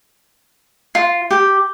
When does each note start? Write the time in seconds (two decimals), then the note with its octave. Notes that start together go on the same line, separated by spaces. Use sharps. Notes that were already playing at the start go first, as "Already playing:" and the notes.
0.95 F4
1.31 G4